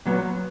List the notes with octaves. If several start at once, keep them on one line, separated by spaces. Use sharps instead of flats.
A#2 F#3 B3